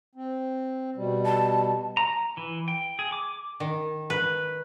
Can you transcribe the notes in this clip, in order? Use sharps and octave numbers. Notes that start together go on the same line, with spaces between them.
C4
B2 G3
A5
A#5
E3
G5
G#4
D6
D#3
B4